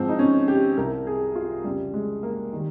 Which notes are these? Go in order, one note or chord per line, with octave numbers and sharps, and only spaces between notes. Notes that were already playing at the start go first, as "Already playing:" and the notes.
Already playing: G#2 F3 C4
D#4
C#4
G4
C2 C3 G3 A#4
G#4
F4
F2 C#3 G3
G#3
A#3
D#3 G3